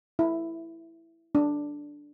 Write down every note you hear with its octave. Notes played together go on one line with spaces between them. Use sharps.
E4
D4